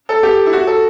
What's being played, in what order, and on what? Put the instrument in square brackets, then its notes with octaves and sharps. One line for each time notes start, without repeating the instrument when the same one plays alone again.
[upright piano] A4
G4
E4
F#4
A4